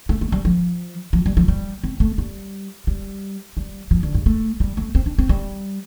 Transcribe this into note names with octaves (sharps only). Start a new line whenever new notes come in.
A3
A3
G3
F3
F3
G3
F3
G3
C4
A3
G3
G3
G3
F3
D3
G2
A3
G3
A3
C4
D4
C4
G3